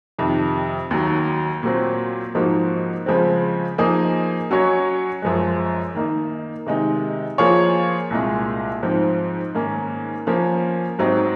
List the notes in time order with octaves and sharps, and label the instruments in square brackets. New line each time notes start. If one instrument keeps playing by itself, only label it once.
[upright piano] F2 C3 D#3
D#2 D#3 F#3
A#2 F#3 C4
G#2 F3 A#3 D#4 F#4
C#3 F3 G#3 C4
F3 A#3 D#4 G#4 D#5
F#3 C#4 F#4 C#5
F#2 F3 G#3
D#3 A#3 D#4
C3 D#3 G#3 D#4
F3 A#3 F4 G#4 C#5
C2 A#2 G#3
G#2 F3 C4
G#2 D#3 A#3 C#4
F3 A#3 C#4
G#2 F#3 C4 D#4